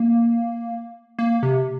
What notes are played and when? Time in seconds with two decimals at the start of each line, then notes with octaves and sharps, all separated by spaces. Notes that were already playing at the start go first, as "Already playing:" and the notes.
Already playing: A#3
1.19 A#3
1.43 C3